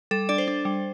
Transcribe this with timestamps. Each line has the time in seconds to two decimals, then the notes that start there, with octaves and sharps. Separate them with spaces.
0.11 G3 A4
0.29 D4 D5
0.38 C5
0.48 D4
0.65 G3